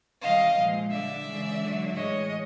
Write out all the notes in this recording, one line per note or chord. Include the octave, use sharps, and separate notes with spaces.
C3 D#3 G3 D#5 F5
A#2 F3 G#3
D3 G3 D5 E5
C#3 E3 G#3
D3 F#3
A2 E3 G#3 C#5 D#5